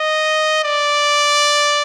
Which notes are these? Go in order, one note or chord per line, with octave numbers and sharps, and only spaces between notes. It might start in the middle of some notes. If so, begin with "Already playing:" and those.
Already playing: D#5
D5